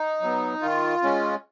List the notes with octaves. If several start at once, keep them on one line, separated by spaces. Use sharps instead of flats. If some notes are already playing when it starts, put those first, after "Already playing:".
Already playing: D#4
F#3 B3
D#3 F4
G#3 C#4